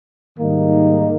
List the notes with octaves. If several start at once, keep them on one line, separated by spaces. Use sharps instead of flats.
G#2 D#3 G3 A#3 D#4